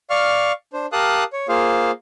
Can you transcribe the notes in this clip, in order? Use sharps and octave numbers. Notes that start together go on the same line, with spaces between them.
D5 F5 C#6 F6
D4 C5
G4 A#4 F5 A5 D#6 F#6
C#5
A#3 F4 G#4 C5 F5